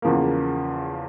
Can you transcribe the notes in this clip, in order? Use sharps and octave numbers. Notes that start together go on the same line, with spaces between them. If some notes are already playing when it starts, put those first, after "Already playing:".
E2 C#3 F3 A#3